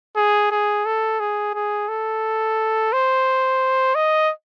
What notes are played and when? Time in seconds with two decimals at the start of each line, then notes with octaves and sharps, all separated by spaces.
0.16 G#4
0.51 G#4
0.86 A4
1.20 G#4
1.54 G#4
1.89 A4
2.93 C5
3.95 D#5